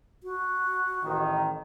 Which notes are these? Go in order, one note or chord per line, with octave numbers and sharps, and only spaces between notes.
F#4
A1 D#3